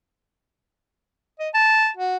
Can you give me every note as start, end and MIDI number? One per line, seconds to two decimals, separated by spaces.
1.40 1.49 75
1.54 1.89 81
1.97 2.17 66